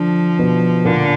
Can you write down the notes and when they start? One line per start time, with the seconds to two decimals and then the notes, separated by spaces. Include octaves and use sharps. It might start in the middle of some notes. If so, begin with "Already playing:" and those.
Already playing: D3 F3 D4
0.39 B2 B3
0.85 A#2 D3 A#3